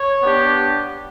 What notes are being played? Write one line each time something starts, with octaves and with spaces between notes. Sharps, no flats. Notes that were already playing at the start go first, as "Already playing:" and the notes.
Already playing: C#5
B3 D4 G4